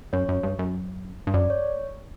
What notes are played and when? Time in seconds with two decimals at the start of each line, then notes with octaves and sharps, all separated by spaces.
0.13 F#2 C#5
0.29 F#2
0.43 G2
0.59 F#2
1.27 G2
1.34 F#2 D5
1.50 C#5